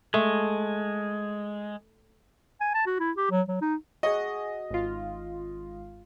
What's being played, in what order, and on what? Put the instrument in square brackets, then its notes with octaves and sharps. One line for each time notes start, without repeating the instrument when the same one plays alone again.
[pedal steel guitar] G#3 [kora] A3
[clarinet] G#5
A5
F#4
E4
G4
F#3
F#3
D#4
[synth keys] F#4 G#4 [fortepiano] D#5
[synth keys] G#1 F4